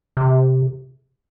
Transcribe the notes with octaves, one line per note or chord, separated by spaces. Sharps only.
C3